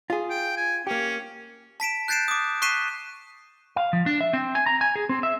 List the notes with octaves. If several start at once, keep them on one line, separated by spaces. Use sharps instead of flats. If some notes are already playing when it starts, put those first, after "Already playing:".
F4 G#4
G5
G#5
A#3 C#4 G4
A5 B6 D7 E7
F#6 G6 A6 C7 D7 E7
D6 D#6
C#6 F#6 B6 C7 D#7 E7
F5
F3
D4
E5
C4
G#5
A#5
G#5
G#4
C4
E5